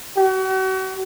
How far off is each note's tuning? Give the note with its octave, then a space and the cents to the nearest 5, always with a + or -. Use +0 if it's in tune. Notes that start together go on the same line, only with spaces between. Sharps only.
F#4 +40